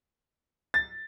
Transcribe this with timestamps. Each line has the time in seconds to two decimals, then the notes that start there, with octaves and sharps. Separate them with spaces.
0.74 A6